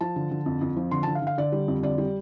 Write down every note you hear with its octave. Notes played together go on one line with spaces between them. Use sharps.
F3 A5
D3
D3
F2
F2
F3
D3 C6
A5
D3
F5
D3
F5
D3 D5
G3
F2
D3 D5
G3